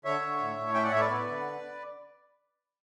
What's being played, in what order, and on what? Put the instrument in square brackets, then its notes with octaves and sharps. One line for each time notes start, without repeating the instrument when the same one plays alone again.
[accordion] D3 C#5 E5
D3
A2
A2
C#4 E5 G5
D5 F#5
A2 C#5 E5
B4 D5
B3
D3